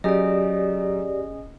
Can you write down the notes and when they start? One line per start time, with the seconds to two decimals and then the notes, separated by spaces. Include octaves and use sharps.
0.04 F#3 C#4 G4 G#4 D5 D#5